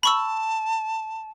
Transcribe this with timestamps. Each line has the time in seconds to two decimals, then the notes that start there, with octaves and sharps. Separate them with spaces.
0.03 A5 B5 C#6 E6